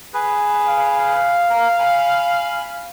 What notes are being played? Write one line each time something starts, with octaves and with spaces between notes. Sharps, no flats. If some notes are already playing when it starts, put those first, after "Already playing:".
G#4 B4
F5
A#4
G#5 B5